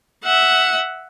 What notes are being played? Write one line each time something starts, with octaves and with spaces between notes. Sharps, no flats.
E5 F#5